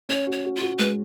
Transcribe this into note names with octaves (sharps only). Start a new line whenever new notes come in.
C#4 C#5
F#4
C#5
F#4
F4
F#4
G#3 B4